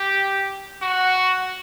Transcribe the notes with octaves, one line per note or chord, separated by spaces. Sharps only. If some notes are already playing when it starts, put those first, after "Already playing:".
Already playing: G4
F#4